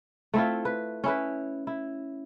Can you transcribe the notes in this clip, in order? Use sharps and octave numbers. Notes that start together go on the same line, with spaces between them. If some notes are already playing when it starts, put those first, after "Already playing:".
A3 C4 E4 F4
B4
C#4 E4 B4
E4